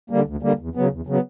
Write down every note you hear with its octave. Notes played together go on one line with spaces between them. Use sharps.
D3 G3 A#3
D2
D3 G3 A#3
E2
C#3 F#3 B3
E2
C#3 F#3 B3